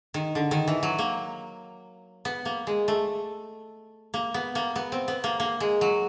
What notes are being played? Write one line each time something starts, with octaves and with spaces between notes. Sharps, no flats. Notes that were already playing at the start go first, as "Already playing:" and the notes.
D#3
D3
D#3
E3
F#3
A#3
B3
A#3
G#3
A3
A#3
B3
A#3
B3
C4
B3
A#3
A#3
G#3
F#3